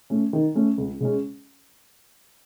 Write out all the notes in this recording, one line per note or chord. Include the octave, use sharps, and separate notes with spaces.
A3 C#4
D#3
A3 C#4
C#2
C#3 G#3 C#4